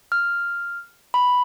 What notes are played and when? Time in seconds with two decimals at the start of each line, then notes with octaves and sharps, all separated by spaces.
0.12 F6
1.14 B5